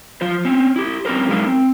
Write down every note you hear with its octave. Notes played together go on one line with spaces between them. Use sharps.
F3 F4 C5
C4 C#4
E4 G4
C4 C#4 G4 A#4 C5
F#3 G#3 D#4 E4 A#4 F5
C4